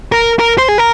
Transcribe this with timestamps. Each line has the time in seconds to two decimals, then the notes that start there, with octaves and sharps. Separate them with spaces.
0.12 A#4
0.40 A#4
0.58 C5
0.68 G#4
0.78 A#4